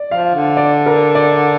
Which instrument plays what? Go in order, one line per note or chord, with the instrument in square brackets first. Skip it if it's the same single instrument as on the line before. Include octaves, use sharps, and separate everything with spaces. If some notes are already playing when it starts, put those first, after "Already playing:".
Already playing: [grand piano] D5
[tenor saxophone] F3 [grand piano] F5
[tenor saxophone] D3
[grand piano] D5
A#4
D5